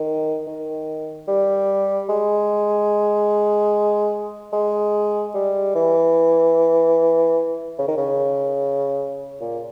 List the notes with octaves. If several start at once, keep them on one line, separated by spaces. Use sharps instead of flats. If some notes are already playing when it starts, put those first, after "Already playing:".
Already playing: D#3
D#3
G3
G#3
G#3
G3
E3
C#3
D#3
C#3
A#2